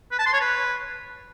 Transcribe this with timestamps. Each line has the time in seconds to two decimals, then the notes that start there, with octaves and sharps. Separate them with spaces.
0.12 B4
0.19 A5
0.26 C6
0.33 C#5
0.40 B4